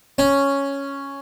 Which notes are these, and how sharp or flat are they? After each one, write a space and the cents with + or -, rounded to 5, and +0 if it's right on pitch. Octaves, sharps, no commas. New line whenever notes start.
C#4 +0